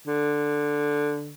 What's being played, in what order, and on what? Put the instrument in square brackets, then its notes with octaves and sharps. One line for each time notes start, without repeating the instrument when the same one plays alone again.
[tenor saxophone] D3